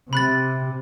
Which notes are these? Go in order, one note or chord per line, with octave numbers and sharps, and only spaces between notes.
C3 B5 F#6 A6